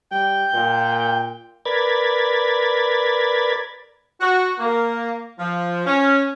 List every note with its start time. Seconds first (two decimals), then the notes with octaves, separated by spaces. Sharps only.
0.12 G3 G5
0.54 A#2
0.99 G5
1.65 A#4 B4 D5 B5 G#6 A6
4.21 F#4
4.59 A#3
5.39 F3
5.86 C#4